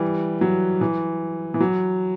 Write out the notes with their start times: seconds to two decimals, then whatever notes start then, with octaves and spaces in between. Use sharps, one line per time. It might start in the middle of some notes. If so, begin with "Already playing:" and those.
Already playing: E3 G3
0.41 F#3
0.81 E3
1.54 E3
1.60 F#3